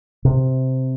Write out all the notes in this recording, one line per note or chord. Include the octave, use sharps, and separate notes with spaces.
C3